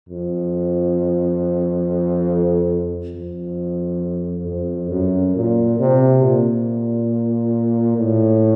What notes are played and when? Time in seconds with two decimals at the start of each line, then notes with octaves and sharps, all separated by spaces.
0.09 F2
3.16 F2
4.47 F2
4.91 F#2
5.36 A#2
5.79 C3
6.23 A#2
7.98 A2